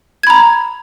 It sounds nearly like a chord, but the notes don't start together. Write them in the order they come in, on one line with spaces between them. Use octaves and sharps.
G#6 B5 A#5